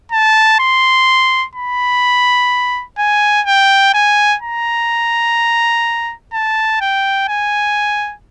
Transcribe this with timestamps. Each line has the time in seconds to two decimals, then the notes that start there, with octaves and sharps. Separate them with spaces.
0.12 A5
0.60 C6
1.55 B5
2.98 G#5
3.47 G5
3.94 G#5
4.42 A#5
6.33 A5
6.81 G5
7.29 G#5